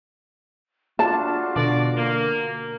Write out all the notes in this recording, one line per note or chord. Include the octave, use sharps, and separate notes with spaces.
D4 F4 F#4 A5
B2 D3 D5 A#6
A#3